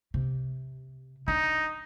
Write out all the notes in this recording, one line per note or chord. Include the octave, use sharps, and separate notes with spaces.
C3
D4 D#4